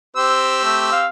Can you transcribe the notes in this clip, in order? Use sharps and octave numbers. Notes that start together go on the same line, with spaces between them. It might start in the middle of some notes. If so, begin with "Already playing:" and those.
C4 G4 C5 E6
A3
F5